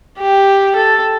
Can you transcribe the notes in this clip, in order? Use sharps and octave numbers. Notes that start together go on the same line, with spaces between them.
G4
A4